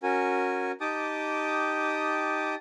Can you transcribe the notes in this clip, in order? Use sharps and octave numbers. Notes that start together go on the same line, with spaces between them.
C#4 F#4 A#4 G#5
D#4 G4 G5 A5 D6 D#6